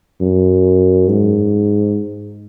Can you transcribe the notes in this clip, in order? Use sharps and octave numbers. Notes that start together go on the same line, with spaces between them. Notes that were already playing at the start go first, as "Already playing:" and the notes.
F#2
G#2